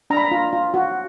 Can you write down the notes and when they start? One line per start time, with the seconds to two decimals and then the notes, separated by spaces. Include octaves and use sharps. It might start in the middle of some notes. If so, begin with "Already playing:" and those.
0.10 D4 A#5
0.17 B5
0.25 A#5
0.31 F4
0.53 F4
0.74 F#4